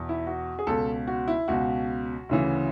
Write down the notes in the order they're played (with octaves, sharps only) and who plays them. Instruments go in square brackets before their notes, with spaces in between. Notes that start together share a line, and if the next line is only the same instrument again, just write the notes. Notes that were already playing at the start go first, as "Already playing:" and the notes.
Already playing: [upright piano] E2 B2
E4
F#4
G#4
C#2 B2 A4
F#4
E4
C#2 B2 F#4
D2 C#3 E3